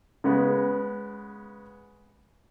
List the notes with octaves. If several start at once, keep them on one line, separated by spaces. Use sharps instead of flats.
C#3 G#3 B3